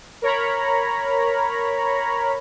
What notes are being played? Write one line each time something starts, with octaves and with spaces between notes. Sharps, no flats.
A#4 C#5 A#5 B5